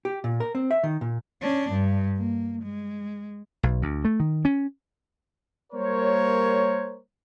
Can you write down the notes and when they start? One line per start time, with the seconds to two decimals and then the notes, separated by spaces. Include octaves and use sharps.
0.05 G4
0.24 A#2
0.40 A#4
0.55 C4
0.71 E5
0.83 D#3
1.01 A#2
1.41 C#4 D4
1.72 G2
2.18 A#3
2.63 G#3
3.63 B1
3.82 D2
4.05 A3
4.20 D#3
4.45 C#4
5.73 G3 A#3 A#4 C5 C#5